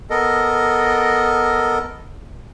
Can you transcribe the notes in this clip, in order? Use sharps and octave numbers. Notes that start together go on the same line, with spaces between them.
B3 A4 A#4 D#5